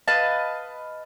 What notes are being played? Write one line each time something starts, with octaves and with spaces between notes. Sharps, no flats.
B4 D#5 F5 A5